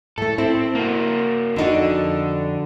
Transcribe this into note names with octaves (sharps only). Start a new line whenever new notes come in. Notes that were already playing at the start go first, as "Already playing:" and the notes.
A2 A3 A4
C4 E4
A#3 F#4
F2 D3 D4 D#4 F#4